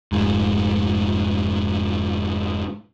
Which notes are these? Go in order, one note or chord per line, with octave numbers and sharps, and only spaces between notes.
F1 G#2